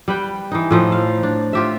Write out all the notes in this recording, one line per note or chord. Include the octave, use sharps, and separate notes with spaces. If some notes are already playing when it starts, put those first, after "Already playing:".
G3 B4 G5
E3 D#4
A2 F3 D#4
F5
D4
F4 G4 E5